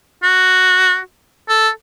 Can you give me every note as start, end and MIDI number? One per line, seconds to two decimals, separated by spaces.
0.23 0.99 66
1.49 1.69 69